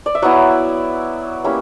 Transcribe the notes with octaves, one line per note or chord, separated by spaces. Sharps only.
D5
E5
F#3 B3 E4 F#5
G3 A#3 C#4 E4